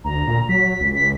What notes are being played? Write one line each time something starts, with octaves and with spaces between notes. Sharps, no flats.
D2 A#5
A#2
F#3 B6
C#2
B6